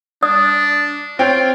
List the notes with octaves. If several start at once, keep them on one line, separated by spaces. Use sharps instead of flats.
D4 D5 D#6
C4 F4 C#5 G5